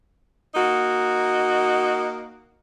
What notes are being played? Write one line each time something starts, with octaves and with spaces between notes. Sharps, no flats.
A#3 D#4 F#4